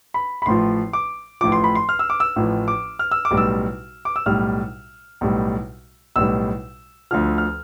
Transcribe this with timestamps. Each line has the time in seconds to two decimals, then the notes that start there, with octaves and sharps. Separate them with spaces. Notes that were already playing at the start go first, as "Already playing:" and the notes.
0.14 B5
0.42 B5
0.46 A1 A2 F3 C6
0.93 D6
1.41 A1 A2 F3 D6
1.52 C6
1.64 B5
1.75 C6
1.89 F6
1.99 E6
2.10 D6
2.20 E6
2.36 A1 A2 F3
2.68 D6
2.99 F6
3.11 E6
3.25 D6
3.31 B1 A2 G3
3.37 E6
4.05 D6
4.16 E6
4.26 B1 A2 G3 F6
5.21 B1 A2 G3
6.16 B1 A2 G3 E6
7.11 D2 D3 F3 F6
7.38 F6